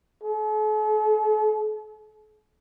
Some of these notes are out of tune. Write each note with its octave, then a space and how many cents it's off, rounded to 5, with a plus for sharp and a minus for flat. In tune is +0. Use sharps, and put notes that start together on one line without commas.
A4 -45